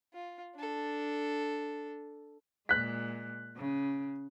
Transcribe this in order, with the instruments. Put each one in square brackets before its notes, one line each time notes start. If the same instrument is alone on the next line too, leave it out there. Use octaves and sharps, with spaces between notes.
[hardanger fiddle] F4
D4 A4
[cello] A#2 G#3 [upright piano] F#6 B6
[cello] C#3